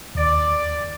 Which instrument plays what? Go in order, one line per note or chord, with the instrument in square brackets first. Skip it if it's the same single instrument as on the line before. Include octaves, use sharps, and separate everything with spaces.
[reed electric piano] D#2 [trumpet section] D5